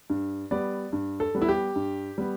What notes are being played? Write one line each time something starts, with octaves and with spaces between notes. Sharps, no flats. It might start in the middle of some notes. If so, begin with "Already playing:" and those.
G2
G3 B3 D5
G2
A4
G3 B3
E4
G4
G2
G3 B3